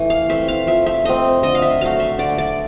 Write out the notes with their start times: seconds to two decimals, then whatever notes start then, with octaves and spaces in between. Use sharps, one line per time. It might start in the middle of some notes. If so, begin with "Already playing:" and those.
Already playing: E3 A3
0.10 F5
0.29 A3 C4 E5
0.48 F5
0.67 F3 E5
0.86 E5
1.05 A3 C4 D#5
1.43 D3 D#5
1.55 F5
1.62 E5
1.81 F#3 A3 F5
2.00 E5
2.19 D3 D5
2.38 D5